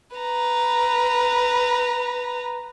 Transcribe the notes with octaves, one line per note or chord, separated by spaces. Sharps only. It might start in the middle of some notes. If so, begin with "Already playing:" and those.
B4 A#5